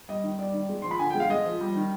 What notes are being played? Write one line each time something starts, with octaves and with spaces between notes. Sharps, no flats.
G3 D#5
D#3
G3 D5
D#3
G#3
F3 C6
B5
D3 G#5
G5
G#3
F5
G#3 D#5
F3
G3
D#3